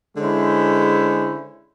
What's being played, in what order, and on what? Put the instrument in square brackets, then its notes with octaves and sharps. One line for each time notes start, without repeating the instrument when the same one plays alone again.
[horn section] D3 G#3 C#4 E4 C5